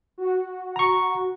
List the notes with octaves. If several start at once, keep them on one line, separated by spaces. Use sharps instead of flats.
F#4
A#5 C#6